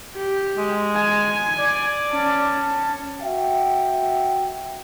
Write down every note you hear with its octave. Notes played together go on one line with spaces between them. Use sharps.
G4
G#3
G#5
D5
C#4 A5
F#4 E5 G5